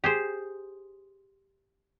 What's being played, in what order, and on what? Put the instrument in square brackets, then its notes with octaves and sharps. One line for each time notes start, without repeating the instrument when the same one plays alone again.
[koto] G4 G#4 C5